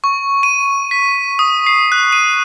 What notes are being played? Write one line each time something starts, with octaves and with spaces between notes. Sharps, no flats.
C#6
D#7
B6
D#6
C7
F#6
D#7